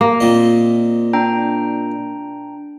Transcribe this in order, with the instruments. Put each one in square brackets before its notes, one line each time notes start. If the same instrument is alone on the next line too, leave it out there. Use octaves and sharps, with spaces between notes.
[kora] A#3
[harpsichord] A#2 C4 D#5
[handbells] D4 G5 A#5